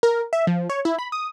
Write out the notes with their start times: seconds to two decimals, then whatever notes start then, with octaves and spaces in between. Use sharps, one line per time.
0.03 A#4
0.33 E5
0.47 F3
0.70 C#5
0.85 E4
0.99 B5
1.12 D#6